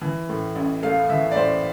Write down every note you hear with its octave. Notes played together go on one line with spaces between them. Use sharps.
E3
A2
A1
A3 F5
E3 E5
D5
A2 C5